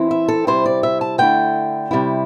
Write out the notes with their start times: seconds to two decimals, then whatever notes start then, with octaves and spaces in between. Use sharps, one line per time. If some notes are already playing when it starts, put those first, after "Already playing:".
Already playing: E3 C4 E4
0.11 E5
0.28 A4
0.47 C3 G3 E4 C5
0.66 D5
0.83 E5
1.01 A5
1.18 D3 A3 E4 G5
1.91 C3 G3 E4